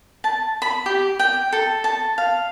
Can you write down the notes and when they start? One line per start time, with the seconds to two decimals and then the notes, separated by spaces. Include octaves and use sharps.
0.24 A5
0.62 B5
0.86 G4
1.19 G5
1.52 A4
1.84 A5
2.18 F5